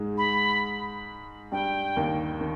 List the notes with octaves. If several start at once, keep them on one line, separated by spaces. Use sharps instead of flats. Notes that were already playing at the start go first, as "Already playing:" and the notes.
Already playing: G#2 G#3
B5
G2 G3 G5
D#2 D#3
D#3